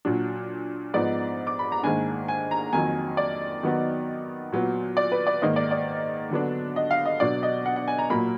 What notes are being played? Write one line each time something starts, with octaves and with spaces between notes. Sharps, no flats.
A#2 F#3 D4
G#2 F3 B3 D#4 D5
D6
B5
A#5
G#2 D#3 A#3 D4 G#5
G#5
A#5
F2 D#3 F#3 A#3 G#5
D5
D#3 F#3 B3 D#4
A#2 F#3 B3
D5
B4
D5
G#2 D#3 A#3 D#4 D#5
D5
D5
D3 F#3 B3 D4
D#5
F5
D#5
B2 F#3 D4 D5
D#5
F#5
F#5
G#5
A#5
A#2 F#3 A#3 B5